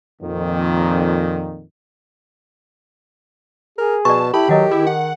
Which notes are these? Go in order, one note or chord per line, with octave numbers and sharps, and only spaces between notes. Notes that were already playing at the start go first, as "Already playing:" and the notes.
F2 A#2 D#3
G#4 A#4
B2 D5 A5 C#6
E4 G4 A4 A5 B5
D#3 F#3 A4 D#5 F#5
D#3 E4 G#4
F#5